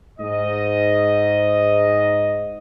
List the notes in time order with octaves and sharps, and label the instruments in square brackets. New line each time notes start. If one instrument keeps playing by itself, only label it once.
[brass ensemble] G#2 D#5